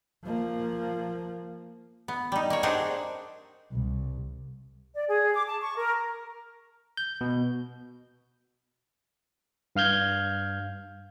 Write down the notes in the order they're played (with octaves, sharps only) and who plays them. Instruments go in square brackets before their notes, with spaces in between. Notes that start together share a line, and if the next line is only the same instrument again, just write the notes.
[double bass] F3 A#3
[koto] B3
G3 D#4
A#3 C#5
C4 D4 D#4 G#4 F#5
[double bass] C2
[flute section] D5
G#4
D6
A5
C#6
A#4
[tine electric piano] G6
B2
G2 F5 F6 G6 G#6